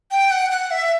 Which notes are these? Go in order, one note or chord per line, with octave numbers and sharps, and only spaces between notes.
G5
F#5
F#5
E5